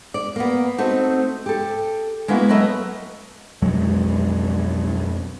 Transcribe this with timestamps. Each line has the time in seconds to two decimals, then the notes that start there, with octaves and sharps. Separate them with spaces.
0.14 D5
0.36 A#3 B3
0.78 A3 C4 D#4 F#4
1.46 G4 A4
2.28 G#3 A#3 B3 E4 F#4
2.49 F#3 A3 A#4 B4 D#5 E5
3.62 B1 F2 F#3 G#3